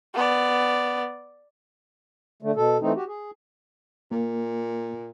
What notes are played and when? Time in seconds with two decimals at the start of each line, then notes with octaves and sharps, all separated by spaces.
0.15 B3 D5
2.42 D3 A3
2.56 B2 A4
2.81 E3 A3 C4 D#4
2.96 F#4 G4
3.08 G#4
4.11 A#2 A#3